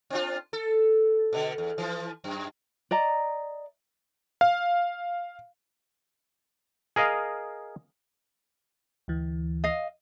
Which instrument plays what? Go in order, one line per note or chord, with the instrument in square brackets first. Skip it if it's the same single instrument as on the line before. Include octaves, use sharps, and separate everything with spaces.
[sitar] C4 D4 F4
A4
B2 D3
E2
E3 F3
F#2
[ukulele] D5 D#5 A#5
[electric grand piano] F5
[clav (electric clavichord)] G#4 A#4 D#5 F5
[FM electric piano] D2 E3
[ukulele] D#5 F5